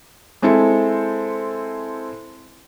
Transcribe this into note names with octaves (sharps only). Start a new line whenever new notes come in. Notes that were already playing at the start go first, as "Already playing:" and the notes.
G#3 C4 E4 A4